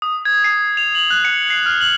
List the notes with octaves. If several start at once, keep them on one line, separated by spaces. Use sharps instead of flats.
D#6
G#6
C7
F7
F#7
F#6
C#7
C7
F6
F#7